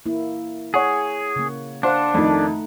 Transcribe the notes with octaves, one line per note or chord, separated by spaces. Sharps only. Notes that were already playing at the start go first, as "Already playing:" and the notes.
A#3 E4
G#4 C#5 F#5
C#3 A#3
D4 C5 F5 F#5
F2 D#3 A3 D#4